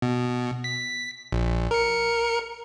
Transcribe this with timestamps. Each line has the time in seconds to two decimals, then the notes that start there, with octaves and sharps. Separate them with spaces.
0.02 B2
0.64 B6
1.32 A#1
1.71 A#4 C#7